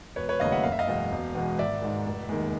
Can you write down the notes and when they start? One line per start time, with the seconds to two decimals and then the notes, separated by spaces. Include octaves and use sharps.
0.16 E1 B4 C#5
0.29 B4 C#5
0.40 D#2 C#3 F#3 A3 D#5 F5
0.52 E5 F#5
0.64 F#1 F5
0.72 E5
0.79 D#5 F5
0.87 E2 B2 G#3
1.12 E1
1.35 E2 B2 G#3
1.59 G#1 D5 E5
1.82 G#2 D#3 G#3
2.05 F1
2.29 D#2 D#3 G#3